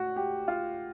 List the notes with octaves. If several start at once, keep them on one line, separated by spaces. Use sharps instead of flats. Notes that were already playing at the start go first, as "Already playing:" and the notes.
Already playing: A2 F#4
G4
F4